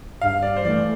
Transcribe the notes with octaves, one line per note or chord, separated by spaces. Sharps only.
G2 F5
D5
C5
E3 A3 D5